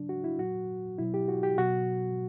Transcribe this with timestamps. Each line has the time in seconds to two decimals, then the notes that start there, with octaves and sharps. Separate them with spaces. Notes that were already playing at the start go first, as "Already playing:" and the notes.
Already playing: C#3 F#3 D4
0.09 F#4
0.24 E4
0.38 A#2 F#3 F#4
0.98 B2 F#3 E4
1.14 G4
1.28 F#4
1.43 G4
1.58 B2 F#3 F#4